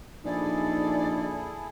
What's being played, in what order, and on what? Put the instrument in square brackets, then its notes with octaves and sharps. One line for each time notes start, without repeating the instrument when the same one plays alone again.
[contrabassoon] A#1 [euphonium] D#4 [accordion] E4 G#4 A4 [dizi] D5